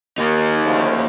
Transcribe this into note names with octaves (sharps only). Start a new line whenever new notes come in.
D#2 A#3 D#4
D2 C#3 F3